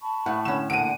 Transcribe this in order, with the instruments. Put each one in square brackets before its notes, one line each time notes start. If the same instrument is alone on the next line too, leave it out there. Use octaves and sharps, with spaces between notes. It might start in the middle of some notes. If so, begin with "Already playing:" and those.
[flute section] A5 B5 C#6
[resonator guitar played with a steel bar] A2 [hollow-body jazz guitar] F#5
[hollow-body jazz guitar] D3 C#4 [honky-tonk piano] E7
[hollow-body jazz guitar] A#2 D3 [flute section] F#5 [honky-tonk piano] D7 D#7